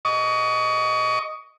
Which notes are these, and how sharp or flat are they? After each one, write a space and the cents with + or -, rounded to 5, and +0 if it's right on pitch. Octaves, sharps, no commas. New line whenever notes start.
D#5 +0 C#6 +30